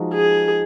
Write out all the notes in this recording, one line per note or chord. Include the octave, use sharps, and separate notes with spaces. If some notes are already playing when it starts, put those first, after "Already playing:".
Already playing: F3 G#3 D#4 F#4
G#4